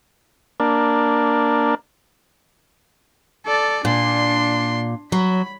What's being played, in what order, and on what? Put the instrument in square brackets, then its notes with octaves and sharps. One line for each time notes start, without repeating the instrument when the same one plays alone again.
[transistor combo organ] A#3 D4
[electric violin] A4 D5
[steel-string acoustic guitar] A#2 [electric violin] D4 C6
[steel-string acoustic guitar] F#3 [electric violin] B5